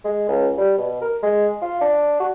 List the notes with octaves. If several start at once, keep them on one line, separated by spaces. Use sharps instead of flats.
G#3
C#2
G3
B2
A#4
G#3
F4
D4
F#4